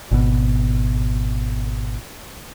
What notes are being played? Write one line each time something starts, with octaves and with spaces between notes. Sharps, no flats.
G#1 B2